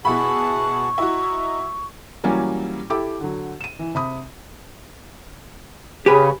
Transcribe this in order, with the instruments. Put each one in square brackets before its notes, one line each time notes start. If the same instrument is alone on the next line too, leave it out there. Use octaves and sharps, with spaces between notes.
[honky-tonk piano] B2 E4 B5 [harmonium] G#4 F#5 A5 [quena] C#6
[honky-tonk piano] E4 F#4 [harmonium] D#5 A#5
[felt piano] E3 F#3 G3 A#3 C#4
E4 G4 A4 G5 D6
D3 F#3
D#7 E7
E3
C3 B5 D#6
[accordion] C#3 [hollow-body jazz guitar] G4 G#4 B4